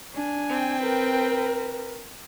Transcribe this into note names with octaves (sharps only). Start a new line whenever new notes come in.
D4 G#5
C4 G5
A#4 B4